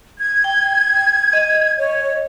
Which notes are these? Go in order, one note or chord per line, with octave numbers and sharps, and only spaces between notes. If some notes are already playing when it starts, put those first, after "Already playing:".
G#6
G5
D#5
C#5